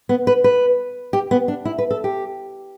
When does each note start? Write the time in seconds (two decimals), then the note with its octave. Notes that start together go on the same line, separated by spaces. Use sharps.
0.09 B3
0.27 B4
0.44 B4
1.13 G4
1.31 B3
1.48 D4
1.65 E4
1.78 B4
1.91 A4
2.04 G4